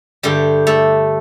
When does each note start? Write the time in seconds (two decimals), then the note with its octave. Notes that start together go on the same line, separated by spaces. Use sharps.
0.23 G2 D3 G3 A3 G4
0.67 A3 A4